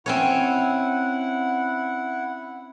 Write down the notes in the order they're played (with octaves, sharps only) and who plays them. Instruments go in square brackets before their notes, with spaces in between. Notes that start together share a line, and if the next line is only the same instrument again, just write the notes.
[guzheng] C4 C#4 C#5 [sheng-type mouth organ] E4 F#5